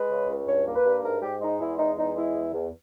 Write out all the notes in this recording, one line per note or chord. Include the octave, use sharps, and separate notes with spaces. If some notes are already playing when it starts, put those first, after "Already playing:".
Already playing: G#3 B4
C#3
C#2
G2 C#5
A#3
B4
G2
G#2 A#4
G#2 G4
G#3 D#4
E2 E4
G#3 D#4
E2 D#4
G#3 E4
E2
E2